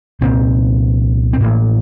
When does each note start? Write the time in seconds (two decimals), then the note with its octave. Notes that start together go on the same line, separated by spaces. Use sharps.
0.21 C2 A#2 C4
1.33 C4
1.41 A1 A2 A#3